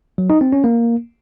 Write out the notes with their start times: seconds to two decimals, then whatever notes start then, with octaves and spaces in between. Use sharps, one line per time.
0.18 F#3
0.30 D#4
0.41 C4
0.52 C#4
0.64 A#3